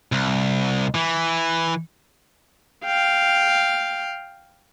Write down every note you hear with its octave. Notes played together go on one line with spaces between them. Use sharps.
C2
E3
F5 G5